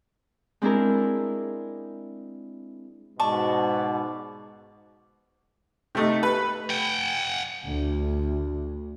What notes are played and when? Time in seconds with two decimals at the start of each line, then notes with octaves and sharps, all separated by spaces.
0.62 G#3 C4 D4 E4 G#4 A#4
3.20 G#2 B2 D5 A5 C#6
5.95 C3 A3 D#4
6.23 B4
6.70 F#5 G5
7.66 D2